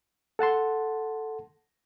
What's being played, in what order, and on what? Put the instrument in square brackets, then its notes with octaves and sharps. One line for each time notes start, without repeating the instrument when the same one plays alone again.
[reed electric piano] A4 F#5 A5 C6